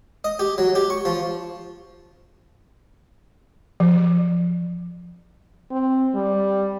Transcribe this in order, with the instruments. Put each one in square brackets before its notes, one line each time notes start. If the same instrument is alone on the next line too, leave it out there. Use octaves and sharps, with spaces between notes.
[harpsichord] D#5
G4
F#3
G4
C#6
F3
[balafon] F3
[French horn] C4
G3